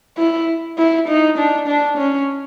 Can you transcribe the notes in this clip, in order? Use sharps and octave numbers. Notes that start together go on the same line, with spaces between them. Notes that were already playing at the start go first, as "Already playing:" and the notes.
E4
E4
D#4
D4
D4
C#4